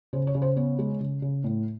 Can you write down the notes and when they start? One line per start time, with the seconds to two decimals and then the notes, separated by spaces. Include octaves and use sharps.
0.13 C#3 C5
0.27 C#5
0.35 C#3
0.42 C5
0.56 B3 C#5
0.79 G#3
1.00 C#3
1.22 C#3
1.44 A2